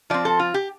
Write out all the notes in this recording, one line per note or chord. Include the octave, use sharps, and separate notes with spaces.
F3 C4 D5
A4
F4
G4